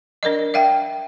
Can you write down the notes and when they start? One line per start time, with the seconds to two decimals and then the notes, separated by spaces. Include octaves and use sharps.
0.23 D4 A#4 D5 D#5
0.54 D5 E5 F5 G5